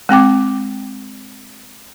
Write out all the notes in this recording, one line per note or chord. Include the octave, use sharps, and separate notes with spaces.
G#3 C4 G5 D6